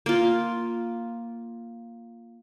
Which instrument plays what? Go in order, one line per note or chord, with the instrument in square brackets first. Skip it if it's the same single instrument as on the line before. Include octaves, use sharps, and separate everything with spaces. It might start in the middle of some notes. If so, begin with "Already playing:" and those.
[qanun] A#3 F4